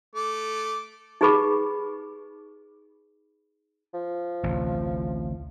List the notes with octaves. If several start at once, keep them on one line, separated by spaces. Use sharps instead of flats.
A3 D6
D#4 G4 G#4 B4 B5 D6
F3
A1 D2 C3